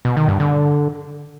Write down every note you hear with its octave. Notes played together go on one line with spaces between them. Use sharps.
B2
D#3
G2
D3